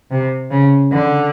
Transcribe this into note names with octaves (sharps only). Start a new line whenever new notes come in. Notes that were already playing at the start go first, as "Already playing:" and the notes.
C3
C#3
D3